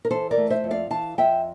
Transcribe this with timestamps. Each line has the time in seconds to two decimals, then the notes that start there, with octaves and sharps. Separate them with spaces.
0.05 A#4
0.11 E3 A4 C5
0.31 A#4 D5
0.37 A3
0.50 C5 E5
0.64 F2
0.71 D5 F5
0.90 E3 F5 A5
1.18 F2 E5 G5